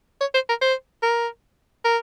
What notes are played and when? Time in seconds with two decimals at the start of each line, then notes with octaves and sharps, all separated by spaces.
0.21 C#5
0.34 C5
0.49 A#4
0.62 C5
1.03 A#4
1.85 A#4